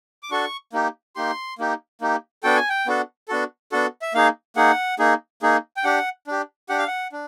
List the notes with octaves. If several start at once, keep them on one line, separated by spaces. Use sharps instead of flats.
D6
D4 F#4 A4 C#6
A#3 D#4 G4
A#3 D#4 G4 C6
A#3 D#4 G4
A#3 D#4 G4
B3 D4 F#4 A4 G5
G#5
G5
B3 D4 F#4 A4
B3 D4 F#4 A4
B3 D4 F#4 A4
E5
A#3 D#4 G#4 F5
A#3 D#4 G#4 F#5
A#3 D#4 G#4
A#3 D#4 G#4
G5
D4 G4 F#5
D4 G4
D4 G4 F#5
F5
F#5
D4